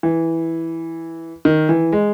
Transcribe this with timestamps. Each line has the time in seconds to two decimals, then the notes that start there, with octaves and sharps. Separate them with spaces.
0.03 E3
1.45 D#3
1.69 E3
1.92 G#3